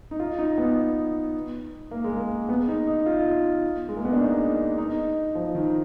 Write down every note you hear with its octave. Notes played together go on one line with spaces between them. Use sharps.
D#4
F4
D#4
B3
A#3
G#3
A#3
B3
D#4
D#4
F4
G#3
A#3
B3
D4
D#4
D#4
F3
D#3